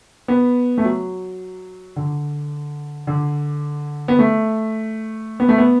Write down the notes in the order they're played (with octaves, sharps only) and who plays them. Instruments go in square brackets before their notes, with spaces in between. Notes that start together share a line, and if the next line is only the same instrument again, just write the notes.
[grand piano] B3
A3
F#3
D3
D3
B3
A3
B3
A3
B3